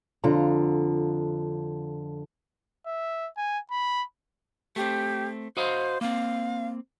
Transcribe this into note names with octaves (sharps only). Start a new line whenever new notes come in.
F2 D3 F4 A#5
E5
G#5
B5
A3 C4 G4
F#4 C5 D#5 F5
A#3 C4 F5